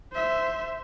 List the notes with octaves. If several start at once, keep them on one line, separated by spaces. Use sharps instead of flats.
C5 E5